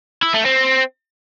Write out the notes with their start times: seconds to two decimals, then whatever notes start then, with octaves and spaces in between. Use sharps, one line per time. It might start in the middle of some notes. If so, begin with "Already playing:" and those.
0.23 E4
0.34 A3
0.46 C4